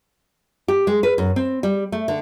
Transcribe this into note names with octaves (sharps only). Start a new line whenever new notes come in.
G4
G#3
B4
F#2
C4
G3
A3
D3